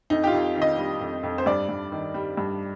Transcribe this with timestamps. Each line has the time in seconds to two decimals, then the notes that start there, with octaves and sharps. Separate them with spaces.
0.10 F2 D#4
0.24 G4
0.27 F4
0.32 F2
0.56 D#3
0.62 D#5
0.78 G3
1.00 F2
1.23 F2
1.38 C5
1.46 G2 D5
1.69 G2
1.92 D#3
2.14 G3
2.37 G2